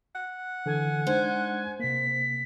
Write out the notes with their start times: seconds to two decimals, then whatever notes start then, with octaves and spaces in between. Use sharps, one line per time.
0.15 F#5
0.66 D3 E3 A4 G#5
1.07 G#3 D4 D#4 C5 G#5
1.80 C3 A#3 B6